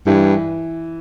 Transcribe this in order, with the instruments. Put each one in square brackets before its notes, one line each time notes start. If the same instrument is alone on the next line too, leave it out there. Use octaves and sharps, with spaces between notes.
[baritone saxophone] G2 [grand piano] E3